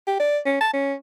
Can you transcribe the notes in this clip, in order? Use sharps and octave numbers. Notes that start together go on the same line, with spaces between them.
G4
D5
C#4
A5
C#4